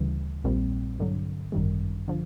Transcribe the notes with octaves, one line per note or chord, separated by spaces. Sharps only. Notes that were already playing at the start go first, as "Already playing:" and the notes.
Already playing: D2 C#3 E3 G3
A#1 A#2 G3 C4
G2 D3 F#3
G#1 F#2 D#3 G3
D3 F3